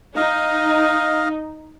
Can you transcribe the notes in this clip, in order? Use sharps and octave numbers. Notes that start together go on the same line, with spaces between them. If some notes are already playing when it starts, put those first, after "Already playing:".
D#4 D#5 F5